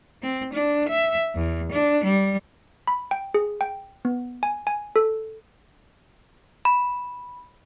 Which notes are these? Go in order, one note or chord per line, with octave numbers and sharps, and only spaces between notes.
C4
D4
E5
E2
D4
G3
B5
G5
G#4
G5
B3
G#5
G#5
A4
B5